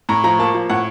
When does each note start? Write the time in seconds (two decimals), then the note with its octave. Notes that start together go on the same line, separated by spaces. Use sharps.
0.09 A2 A#5
0.24 F3 A#5
0.39 A#3 A5
0.54 F3
0.69 A2 F#5